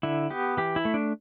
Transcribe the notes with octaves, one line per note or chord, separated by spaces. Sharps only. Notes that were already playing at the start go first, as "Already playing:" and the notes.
D3 E4
B3 G4
E3 G4
E4
A3
D4